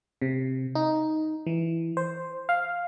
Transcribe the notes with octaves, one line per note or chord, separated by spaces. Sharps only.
C3
D#4
E3
C5
F5